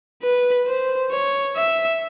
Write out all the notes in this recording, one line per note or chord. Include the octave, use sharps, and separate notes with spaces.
B4
C5
C#5
E5